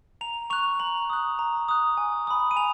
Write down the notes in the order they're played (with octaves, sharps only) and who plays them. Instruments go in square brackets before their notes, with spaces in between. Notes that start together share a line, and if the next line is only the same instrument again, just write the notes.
[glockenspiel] A#5 F7
C#6 F#6 F7
A#5 F#7
D#6 F#6
A#5
D#6 F#6
G#5
B5 D#6
D#7
G#5 F7